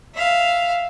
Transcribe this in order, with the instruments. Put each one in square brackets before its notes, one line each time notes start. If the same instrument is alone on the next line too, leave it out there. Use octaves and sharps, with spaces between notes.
[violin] E5 F5